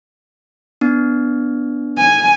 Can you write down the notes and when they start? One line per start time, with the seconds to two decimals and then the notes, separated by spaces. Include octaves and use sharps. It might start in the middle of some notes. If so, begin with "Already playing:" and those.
0.81 B3 D4
1.98 G#5